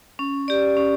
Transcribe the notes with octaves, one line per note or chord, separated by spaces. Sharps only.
C#4
G4 D5
C#4